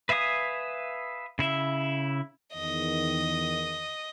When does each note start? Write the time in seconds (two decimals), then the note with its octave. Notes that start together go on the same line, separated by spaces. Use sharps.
0.09 B4 E5 F5 G#5 D#6
1.39 C#3 E4 E5
2.55 E2 D#3 D#5